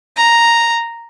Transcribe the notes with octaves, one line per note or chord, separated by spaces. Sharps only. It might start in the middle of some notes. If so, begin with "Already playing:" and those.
A#5